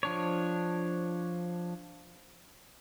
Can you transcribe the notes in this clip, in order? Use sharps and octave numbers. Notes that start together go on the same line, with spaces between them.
F3 D4 C#5